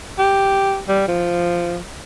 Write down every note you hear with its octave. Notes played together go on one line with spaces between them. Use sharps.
G4
G3
F3